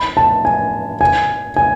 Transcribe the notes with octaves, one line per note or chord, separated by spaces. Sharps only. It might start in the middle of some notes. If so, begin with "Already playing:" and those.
Already playing: B5
A5
G#5
G#5
G#5